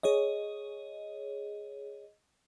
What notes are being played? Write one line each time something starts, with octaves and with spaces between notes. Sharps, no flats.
G#4 C#5 D#5